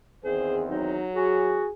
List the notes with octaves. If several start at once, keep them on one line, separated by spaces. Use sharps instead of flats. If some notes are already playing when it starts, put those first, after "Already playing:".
E2 D#3 C4 G#4 C5
F#3 D#4
F#4 G#4